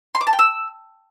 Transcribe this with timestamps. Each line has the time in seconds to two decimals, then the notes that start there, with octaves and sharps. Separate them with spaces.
0.15 C6
0.21 D6
0.27 A5
0.33 G5
0.39 E6